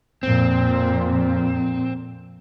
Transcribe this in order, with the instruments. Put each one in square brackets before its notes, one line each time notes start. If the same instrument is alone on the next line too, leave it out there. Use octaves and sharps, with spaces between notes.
[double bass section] F2 A#2 [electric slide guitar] C4